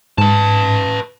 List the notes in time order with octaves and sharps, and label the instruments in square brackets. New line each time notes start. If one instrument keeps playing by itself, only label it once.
[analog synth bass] G#2 [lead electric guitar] B4 A5